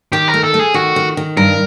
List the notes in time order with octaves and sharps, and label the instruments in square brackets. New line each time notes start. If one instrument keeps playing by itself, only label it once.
[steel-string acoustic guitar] D#3 [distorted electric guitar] G4
[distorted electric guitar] A#4
[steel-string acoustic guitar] A3
[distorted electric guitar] A4
[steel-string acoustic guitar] A3
[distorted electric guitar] G#4
[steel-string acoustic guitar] D#3 [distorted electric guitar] F#4
[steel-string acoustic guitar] D#3
D#3
[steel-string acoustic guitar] G2 [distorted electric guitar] A#4